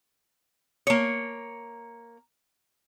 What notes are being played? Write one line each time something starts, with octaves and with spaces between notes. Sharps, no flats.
A#3 C#5